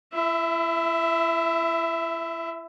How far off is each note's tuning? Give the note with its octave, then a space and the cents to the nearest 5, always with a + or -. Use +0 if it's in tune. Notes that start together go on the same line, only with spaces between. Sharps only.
E4 +30 E5 +0